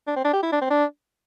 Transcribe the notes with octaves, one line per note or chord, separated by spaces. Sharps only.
D4
C4
D4
G4
E4
D4
C4
D4